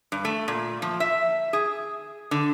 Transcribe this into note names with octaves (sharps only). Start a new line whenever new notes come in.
G2
A3
A#2
F3
E5
G#4
D3